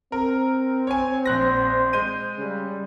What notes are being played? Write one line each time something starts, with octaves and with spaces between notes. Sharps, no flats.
C4 A#4
C#5 G#5
A#1 C5 F#6 A#6
G#3 G6 D#7
C#3 G3